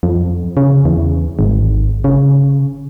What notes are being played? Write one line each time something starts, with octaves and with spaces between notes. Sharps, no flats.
F2
C#3
E2
G#1
C#3